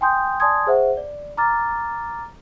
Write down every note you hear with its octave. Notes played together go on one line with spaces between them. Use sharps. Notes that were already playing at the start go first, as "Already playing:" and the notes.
G5 G#5 C6 D#6 G6
D5 G#5 A5 C6 D#6 G#6
G#4 C5 E5 F#5
D5
A#5 D6 F6 A6